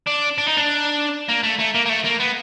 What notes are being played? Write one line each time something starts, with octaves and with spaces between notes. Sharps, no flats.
D4
D4
D#4
D4
A#3
A3
A3
A#3
A#3
A3
A#3
B3